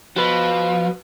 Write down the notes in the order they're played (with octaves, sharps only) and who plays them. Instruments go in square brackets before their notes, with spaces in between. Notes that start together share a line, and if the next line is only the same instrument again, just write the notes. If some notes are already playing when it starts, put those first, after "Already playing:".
[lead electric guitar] F3 [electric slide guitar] F#4 B4